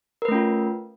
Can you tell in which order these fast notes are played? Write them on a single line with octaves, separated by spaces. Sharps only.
A#4 B4 A3 C#4 F4